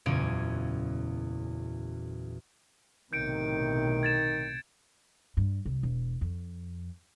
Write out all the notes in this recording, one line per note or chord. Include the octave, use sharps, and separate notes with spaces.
F#1 E2 A#2 C#4 G#6 D7
B1 A2 C3 D#3 G6 C#7 D7
G#6 A6 E7
G2
C2
E1
F2